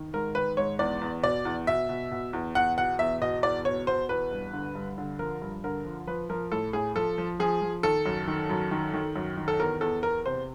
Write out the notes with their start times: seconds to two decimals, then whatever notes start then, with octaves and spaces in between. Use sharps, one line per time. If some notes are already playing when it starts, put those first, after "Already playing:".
Already playing: D#3
0.13 G#2 A#4
0.35 D#3 B4
0.57 G#2 C#5
0.79 E2 D5
1.01 E2
1.23 B2 D5
1.45 E2
1.67 B2 E5
1.89 B2
2.11 B2
2.33 E2
2.55 E2 F#5
2.77 B2 F#5
2.99 E2 E5
3.22 B2 D#5
3.43 E2 D5
3.65 B2 C#5
3.87 B2 C5
4.09 E2 B4
4.31 G2
4.53 D3
4.75 G2
4.98 D3
5.19 F3 A#4
5.42 G2
5.64 D3 A#4
5.85 F3
6.07 F3 B4
6.29 F3 A#4
6.52 A2 A4
6.73 A2 G#4
6.96 F3 A4
7.18 F3
7.40 F3 G#4
7.61 F3
7.83 D#3 A4
8.06 F#2
8.27 D#3
8.50 F#2
8.71 D#3
8.94 D#3
9.16 F#2
9.37 D#3
9.48 A4
9.59 E2 A#4
9.81 E2 A4
10.03 E2 A#4
10.26 C3 C5